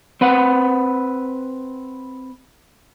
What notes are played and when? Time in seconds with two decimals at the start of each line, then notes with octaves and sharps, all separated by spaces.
0.21 C4 B4 F#5